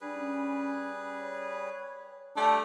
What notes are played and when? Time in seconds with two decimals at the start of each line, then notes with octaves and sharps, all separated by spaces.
0.01 G3 D4 G#4 B4
0.18 C#4
1.19 C#5
2.37 G3 A3 D4 G4